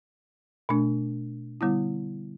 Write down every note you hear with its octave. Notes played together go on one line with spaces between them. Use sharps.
B2 A3 D4
D3 G3 B3 E4